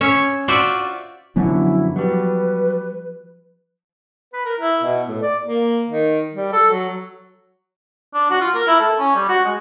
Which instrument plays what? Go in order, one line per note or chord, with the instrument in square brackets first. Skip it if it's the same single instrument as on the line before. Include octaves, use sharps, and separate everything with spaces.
[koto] C#4 C#5 E5
F4 F#4 C5 D5 E5
[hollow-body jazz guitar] F#2 D3 F#3 [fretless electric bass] F3 B3 [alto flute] E4
[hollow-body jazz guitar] F#3 G3 [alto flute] B4
[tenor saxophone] B4
A#4
E4
B2
A2
D5
A#3
D#3
G3
A4
F#3
[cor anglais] D4
F#4
F4
A#4
E4
A4
C#4
G3
F#4
G#3